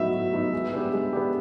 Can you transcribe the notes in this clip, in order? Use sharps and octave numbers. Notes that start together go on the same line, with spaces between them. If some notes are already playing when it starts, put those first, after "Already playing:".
Already playing: A2 F#3 B3 D#4 F#4 E5
A2
F#3 B3 D#4 F#4
G#3
B3 D4 G4
G#3
B3 D4 G4